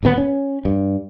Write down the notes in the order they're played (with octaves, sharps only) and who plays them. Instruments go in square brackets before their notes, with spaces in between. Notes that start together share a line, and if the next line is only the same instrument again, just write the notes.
[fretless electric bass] D1 D#2 C#3 B3
C#4
G2